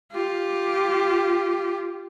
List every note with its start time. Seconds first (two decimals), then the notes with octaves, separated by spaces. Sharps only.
0.12 F4 G4